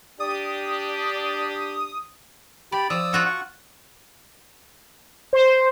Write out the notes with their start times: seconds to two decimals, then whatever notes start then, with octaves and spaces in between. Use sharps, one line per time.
0.20 D4 G4 D5 D#6
2.72 G4 D5 B5
2.90 F3 D5 D#6 E6
3.13 F4 F#4 A4
3.26 F#5 C#6
5.33 C5